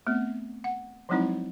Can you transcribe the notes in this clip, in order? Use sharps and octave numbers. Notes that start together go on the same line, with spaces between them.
A3 B3 C4
F#5
F3 F#3 G#3 C4 D#4 E4